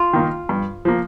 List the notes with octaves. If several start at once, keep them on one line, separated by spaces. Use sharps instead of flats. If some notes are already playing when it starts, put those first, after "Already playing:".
Already playing: F4
D#3 A#3
G2
F3 A#3